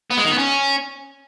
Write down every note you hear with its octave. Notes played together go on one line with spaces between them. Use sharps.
B3
G#3
D#3
B3
C#4